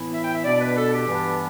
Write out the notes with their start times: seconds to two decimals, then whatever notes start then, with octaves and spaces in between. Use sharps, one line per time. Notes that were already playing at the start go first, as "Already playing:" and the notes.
Already playing: A2 E3 B3 E4
0.13 E5
0.23 G5
0.33 E5
0.44 B2 B3 D4 D5
0.60 B4
0.76 A4
0.92 G4
1.07 G2 E3 G3 B3 D4